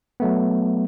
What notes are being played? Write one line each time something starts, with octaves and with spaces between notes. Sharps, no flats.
F#3 A3 B3